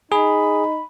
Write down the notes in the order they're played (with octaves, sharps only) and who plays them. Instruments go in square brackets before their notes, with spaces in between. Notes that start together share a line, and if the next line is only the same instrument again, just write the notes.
[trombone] D#4 [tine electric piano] G#4 [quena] B5